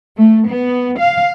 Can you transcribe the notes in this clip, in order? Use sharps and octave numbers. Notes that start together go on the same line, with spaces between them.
A3
B3
F5